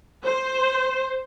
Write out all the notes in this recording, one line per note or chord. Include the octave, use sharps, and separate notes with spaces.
C5